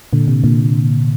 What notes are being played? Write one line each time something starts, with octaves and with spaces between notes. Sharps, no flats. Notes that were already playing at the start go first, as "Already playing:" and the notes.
A#2 D3
C3
A#2 D3